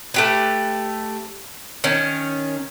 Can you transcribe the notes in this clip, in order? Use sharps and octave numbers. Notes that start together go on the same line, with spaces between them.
A3 G4 B4
D#3 C#4